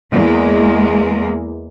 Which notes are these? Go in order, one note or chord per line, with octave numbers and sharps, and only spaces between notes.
E2 G#3 A#3